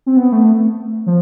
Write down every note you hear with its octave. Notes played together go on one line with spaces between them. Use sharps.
C4
B3
A3
F3